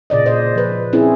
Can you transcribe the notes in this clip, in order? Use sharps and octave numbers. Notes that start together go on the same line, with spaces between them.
A#2 C#3 D5 D#5
C5 D#5
F3 B4
C4 C#4 E4 G#4